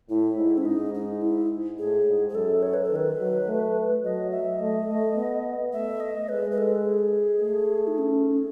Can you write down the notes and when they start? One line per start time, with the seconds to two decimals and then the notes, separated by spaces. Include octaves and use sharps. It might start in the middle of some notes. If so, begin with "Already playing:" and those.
0.09 A2 E4
0.37 G#2
0.58 C#4
0.65 G#2 D#4
0.94 D#4
1.21 E4
1.78 A2 G#4
2.07 G#2
2.29 G#4
2.34 F#2 A4
2.62 C#5
2.74 B4
2.84 A4
2.91 D#3 B4
3.19 F#3
3.47 A3
4.03 F#3 D#5
4.31 E5
4.59 A3 D#5
4.88 A3
5.16 B3
5.73 A3 E5
6.00 D#5
6.28 G#3 B4
6.51 B4
6.58 A4
6.85 G#4
7.41 A3
7.87 D#4
7.98 C#4